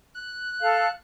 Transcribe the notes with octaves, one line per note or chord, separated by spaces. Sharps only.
F#6
A4 F5